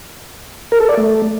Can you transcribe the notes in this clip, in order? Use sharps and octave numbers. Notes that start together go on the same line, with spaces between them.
A#4
A4
D5
A3